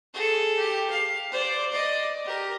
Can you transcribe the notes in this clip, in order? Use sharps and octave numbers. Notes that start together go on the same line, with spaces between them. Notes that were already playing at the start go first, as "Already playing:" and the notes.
G#4 A4
G4
F5
C5 D5
D5 D#5
G4 A#4